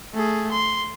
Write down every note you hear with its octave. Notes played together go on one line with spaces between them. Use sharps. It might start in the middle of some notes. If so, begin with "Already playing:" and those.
A3 G#4
C6